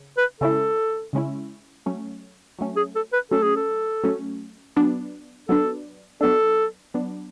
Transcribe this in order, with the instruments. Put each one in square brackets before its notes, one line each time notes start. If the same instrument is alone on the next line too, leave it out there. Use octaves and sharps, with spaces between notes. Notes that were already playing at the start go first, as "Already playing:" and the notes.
Already playing: [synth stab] C#3
[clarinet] B4
[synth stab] C#3 G#3 C#4 E4 [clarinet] A4
[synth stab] C#3 G#3 C#4 E4
F#3 A3 C#4
F#3 A3 C#4
[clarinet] G#4
A4
B4
[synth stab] F#3 A3 C#4 [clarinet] A4
[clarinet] G#4
A4
[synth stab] F#3 A3 C#4
F#3 B3 D4
[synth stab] F#3 B3 D4 [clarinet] A4
[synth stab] F#3 B3 D4 [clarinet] A4
[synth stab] F#3 B3 D4